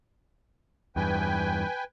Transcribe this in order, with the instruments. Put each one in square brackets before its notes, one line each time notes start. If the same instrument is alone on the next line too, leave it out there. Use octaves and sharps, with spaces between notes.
[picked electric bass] E2 G2 [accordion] B4 G5 G#5